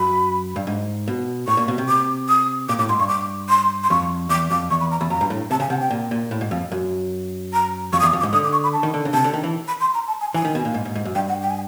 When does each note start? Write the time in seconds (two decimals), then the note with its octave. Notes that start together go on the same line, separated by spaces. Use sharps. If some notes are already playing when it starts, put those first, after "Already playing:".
Already playing: F#2 B5
0.56 G2
0.67 G#2
1.08 B2
1.48 A2 C#6
1.57 A#2
1.68 B2
1.78 C3
1.88 D6
2.29 D#6
2.69 A#2 D6
2.79 A2 D6
2.89 G#2 C6
2.99 G2 C#6
3.08 D6
3.49 C6
3.83 C6
3.90 F2 C#6
4.29 E2 D6
4.50 F2 D6
4.70 E2 C#6
4.81 B5
4.91 A#5
5.00 E2 B5
5.10 F2 A#5
5.21 G2
5.30 A2
5.51 C3 A5
5.60 C#3 G#5
5.70 C3 F#5
5.81 G5
5.91 A#2
6.11 A#2
6.31 A2
6.41 G#2
6.51 F2
6.72 F#2
7.53 A#5
7.93 F2 C#6
8.00 D#6
8.03 E2 D6
8.13 F2
8.20 D6
8.23 G#2
8.33 D3 D#6
8.44 D6
8.53 C#6
8.63 B5
8.73 A5
8.83 D#3
8.94 D3
9.05 C#3
9.13 C3 A5
9.24 D3
9.34 D#3
9.44 E3
9.68 B5
9.80 C6
9.94 A#5
10.08 A5
10.21 G#5
10.34 E3 G#5
10.45 D#3
10.55 B2
10.65 A#2
10.74 G#2
10.85 G#2
10.95 G#2
11.05 F#2
11.15 G2 G5
11.29 F#5
11.42 G5
11.50 G#5